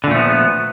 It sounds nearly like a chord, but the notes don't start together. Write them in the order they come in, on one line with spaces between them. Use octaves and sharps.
D3 A#2 A3 F3 B3